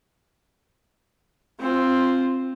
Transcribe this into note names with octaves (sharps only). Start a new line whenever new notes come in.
C4 F4